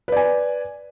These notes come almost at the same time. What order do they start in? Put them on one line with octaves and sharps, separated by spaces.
B4 D5 G#5